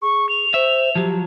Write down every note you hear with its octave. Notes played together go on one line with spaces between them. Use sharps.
G#4 C#6
F7
C5 E5
F3 F#3 G4